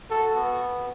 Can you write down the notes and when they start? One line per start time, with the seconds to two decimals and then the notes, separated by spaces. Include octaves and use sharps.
0.10 F#4 A4
0.36 B3